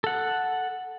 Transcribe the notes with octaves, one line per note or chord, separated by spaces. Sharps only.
A4 F#5